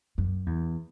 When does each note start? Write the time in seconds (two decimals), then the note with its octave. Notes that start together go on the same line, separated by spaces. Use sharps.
0.18 F#2
0.46 E2